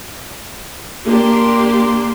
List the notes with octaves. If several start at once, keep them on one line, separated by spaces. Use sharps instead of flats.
A#3 D4 G4 C6